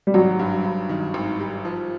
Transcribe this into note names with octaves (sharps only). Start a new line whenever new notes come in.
G3
G#1 F#3
G2
G2
D#3
G#1
G3
F3